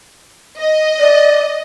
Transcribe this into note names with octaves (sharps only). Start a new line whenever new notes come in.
D#5
D5